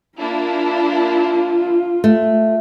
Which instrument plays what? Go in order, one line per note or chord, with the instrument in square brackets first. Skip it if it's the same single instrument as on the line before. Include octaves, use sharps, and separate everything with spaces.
[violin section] A#3 D4 E4 [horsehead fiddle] F4
[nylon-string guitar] A3